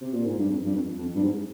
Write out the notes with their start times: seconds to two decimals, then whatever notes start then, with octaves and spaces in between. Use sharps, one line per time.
0.01 C3
0.13 A#2
0.26 G#2
0.38 G2
0.50 F2
0.65 G2
0.74 F2
0.98 F2
1.15 G2
1.23 G#2